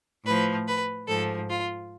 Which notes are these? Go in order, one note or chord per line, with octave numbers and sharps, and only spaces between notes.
A2 F3 B4
B4
G#2 F3 A4
F4